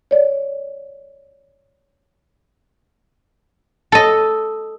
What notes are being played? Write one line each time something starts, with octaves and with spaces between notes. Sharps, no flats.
C#5 D5
A4 D#5